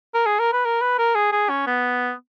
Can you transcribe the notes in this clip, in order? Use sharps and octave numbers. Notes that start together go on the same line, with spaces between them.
A#4
G#4
A#4
B4
A#4
B4
A#4
G#4
G#4
C#4
B3